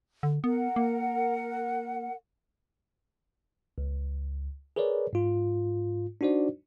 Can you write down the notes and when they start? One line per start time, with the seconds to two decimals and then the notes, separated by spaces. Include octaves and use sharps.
0.23 D3
0.44 B3 A#4 F#5
0.76 A#3
3.78 C#2
4.76 G#4 A#4 B4 C#5 D5
5.13 G#2 F4
6.21 D4 D#4 F#4 C5 D5